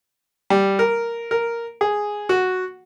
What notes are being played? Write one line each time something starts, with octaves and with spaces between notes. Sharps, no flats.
G3
A#4
A#4
G#4
F#4